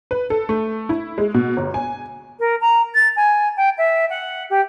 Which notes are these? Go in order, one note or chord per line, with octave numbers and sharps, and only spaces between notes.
B4
A4
A3
E4
G#3
B2
G1
G#5
A#4
A#5
A6
G#5
G5
E5
F#5
G4